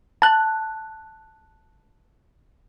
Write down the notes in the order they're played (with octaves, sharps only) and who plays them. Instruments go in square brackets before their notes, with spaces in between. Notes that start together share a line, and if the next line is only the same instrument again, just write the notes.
[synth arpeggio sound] A5 F#6